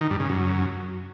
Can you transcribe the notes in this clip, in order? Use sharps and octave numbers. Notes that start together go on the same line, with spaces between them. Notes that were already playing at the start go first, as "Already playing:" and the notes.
D#3
G2
C#3
F#2